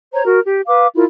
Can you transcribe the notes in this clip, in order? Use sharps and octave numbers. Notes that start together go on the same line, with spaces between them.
C5 C#5 A#5
F#4 A#4
G4
B4 F5 D6
E4 F4 A#4